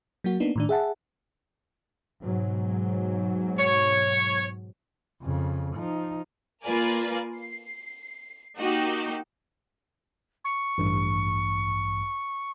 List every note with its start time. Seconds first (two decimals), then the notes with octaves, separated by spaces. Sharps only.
0.24 F#3 A#3 F#4
0.40 A#3 B3 D4 D#4
0.56 A2 D#3 D4
0.69 G#4 E5 F#5 A5
2.22 G#2 B2 F#3
3.57 C#5
5.23 F2 C#3
5.75 F3 D#4
6.63 A#3 F4 A#4 B4 D5 G#5
7.38 C7
8.58 A#3 D#4 F#4 G4
10.45 C#6
10.78 A1 G2